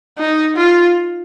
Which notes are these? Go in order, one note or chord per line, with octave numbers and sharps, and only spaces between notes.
D#4
F4